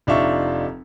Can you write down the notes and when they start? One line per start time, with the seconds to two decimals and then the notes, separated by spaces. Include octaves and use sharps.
0.07 F1 D4 D#4 F4 E5 C#6